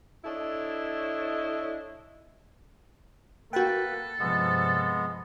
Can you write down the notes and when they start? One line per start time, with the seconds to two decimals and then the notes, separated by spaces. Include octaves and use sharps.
0.24 D4 E4 A4 C#5 D#5
3.53 A#3 F#4 A4 B4 G5
4.20 G2 C3 F3 G#3 B3